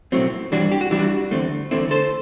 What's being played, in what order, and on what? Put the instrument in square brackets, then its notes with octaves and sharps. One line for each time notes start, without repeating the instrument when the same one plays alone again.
[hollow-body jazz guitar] B1 A2 F#3 C4
G2 E3 G3 D4 F#4
G4
F#4
G2 E3 G3 D4 E4
F#4
E2 D3 A3 C4
E2 D3 A3 C4 E4
A4 C5